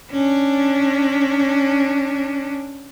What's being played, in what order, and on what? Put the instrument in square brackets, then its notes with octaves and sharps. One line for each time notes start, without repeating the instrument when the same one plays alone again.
[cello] C#4 D4